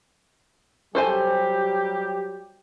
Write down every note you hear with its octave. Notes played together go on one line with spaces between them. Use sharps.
F#3 G3 G4 A4 C5 G#5